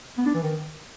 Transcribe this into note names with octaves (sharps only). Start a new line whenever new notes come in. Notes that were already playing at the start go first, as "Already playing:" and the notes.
B3
D4
E3
D#3